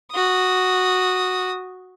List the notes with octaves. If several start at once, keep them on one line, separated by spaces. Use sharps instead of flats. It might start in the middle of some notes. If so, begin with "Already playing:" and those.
F#4 D#6